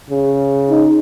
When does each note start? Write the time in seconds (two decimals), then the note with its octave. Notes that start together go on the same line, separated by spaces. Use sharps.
0.10 C#3
0.70 D#4